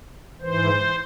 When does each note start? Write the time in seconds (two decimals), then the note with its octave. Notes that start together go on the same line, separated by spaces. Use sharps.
0.41 E3 C5
0.47 G#2